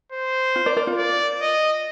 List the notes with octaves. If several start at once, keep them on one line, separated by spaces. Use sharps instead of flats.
C5
F4
A#4 D5
A#4 D5
F4
D5
D#5